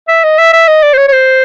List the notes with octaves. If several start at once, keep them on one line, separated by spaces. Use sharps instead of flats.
E5
D#5
E5
E5
D#5
D5
C5
C#5
C#5
C5